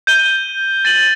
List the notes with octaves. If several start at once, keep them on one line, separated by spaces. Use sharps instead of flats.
G6 D#7 G7
A6 D#7 F#7